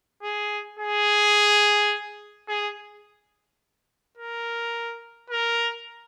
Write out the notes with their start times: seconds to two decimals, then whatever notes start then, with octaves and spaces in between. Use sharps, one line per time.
0.23 G#4
0.79 G#4
2.48 G#4
4.17 A#4
5.30 A#4